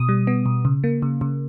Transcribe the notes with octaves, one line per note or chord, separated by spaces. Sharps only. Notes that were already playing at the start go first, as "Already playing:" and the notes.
Already playing: B2 D#6
G3
B3
B2
C#3
A#3
C#3
C#3